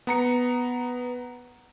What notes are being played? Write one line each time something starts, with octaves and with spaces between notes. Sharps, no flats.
B3 A#5 C#7